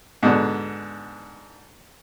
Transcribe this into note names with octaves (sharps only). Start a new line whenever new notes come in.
G#2 B2 D3